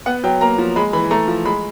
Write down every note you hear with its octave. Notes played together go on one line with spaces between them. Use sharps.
B3 F#5
F#3 G5
A#3 A#5
F3
G#3 B5
E3 B5
A3 A#5
F3
G#3 B5